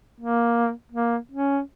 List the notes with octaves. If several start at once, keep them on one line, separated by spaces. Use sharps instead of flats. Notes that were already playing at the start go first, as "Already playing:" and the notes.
A#3
A#3
C#4